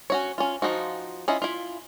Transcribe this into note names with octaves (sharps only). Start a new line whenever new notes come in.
C#4 F#4 C#5
C#4 F4
F3 D#4 F4 F#4
C#4 E4 F4 D#5
E4 F4